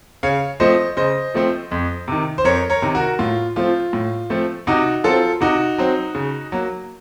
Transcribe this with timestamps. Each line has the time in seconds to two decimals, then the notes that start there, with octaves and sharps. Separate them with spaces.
0.23 C#3 C#5 F5
0.60 F3 A3 C4 C5 D#5
0.97 C#3 C5 D#5
1.34 F3 A3 C4
1.71 F2
2.08 C3 D#3
2.38 C5
2.44 F2 A#4 C#5
2.70 A#4 C#5
2.82 C3 D#3
2.95 F#4 A#4
3.19 A2 F4
3.56 F3 A3 C4 F4
3.93 A2
4.30 F3 A3 C4
4.67 C3 D#4 F#4
5.04 F#3 C4 F4 A4
5.41 C3 D#4 F#4
5.78 F#3 C4
6.15 C#3
6.52 F#3 A#3